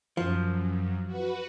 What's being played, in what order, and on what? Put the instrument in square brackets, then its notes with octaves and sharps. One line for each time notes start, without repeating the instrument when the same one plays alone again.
[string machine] F#2 [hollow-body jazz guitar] F3
[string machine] F#4 B4